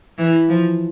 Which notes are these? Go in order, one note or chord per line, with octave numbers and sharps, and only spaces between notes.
E3
F3